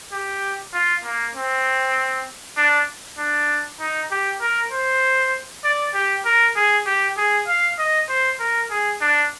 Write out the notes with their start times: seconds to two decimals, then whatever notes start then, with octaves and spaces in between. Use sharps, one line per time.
0.12 G4
0.74 F4
1.05 A#3
1.35 C4
2.57 D4
3.18 D4
3.80 D#4
4.11 G4
4.41 A#4
4.72 C5
5.64 D5
5.94 G4
6.25 A#4
6.56 G#4
6.86 G4
7.17 G#4
7.48 F5
7.78 D#5
8.09 C5
8.40 A#4
8.71 G#4
9.01 D4